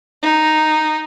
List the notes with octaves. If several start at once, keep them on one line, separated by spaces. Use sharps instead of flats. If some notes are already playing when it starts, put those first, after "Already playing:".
D#4